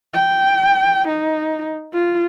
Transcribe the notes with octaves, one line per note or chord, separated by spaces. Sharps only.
G5
D#4
F4